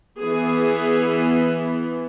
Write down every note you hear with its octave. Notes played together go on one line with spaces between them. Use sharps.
E3 B3 G#4